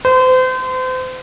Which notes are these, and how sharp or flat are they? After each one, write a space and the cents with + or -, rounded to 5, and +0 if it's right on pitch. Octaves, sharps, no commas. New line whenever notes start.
C5 -35